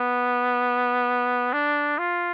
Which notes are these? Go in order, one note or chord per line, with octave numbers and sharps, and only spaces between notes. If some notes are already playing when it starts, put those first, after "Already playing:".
Already playing: B3
D4
F4